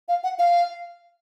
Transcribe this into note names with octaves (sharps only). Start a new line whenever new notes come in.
F5
F#5
F5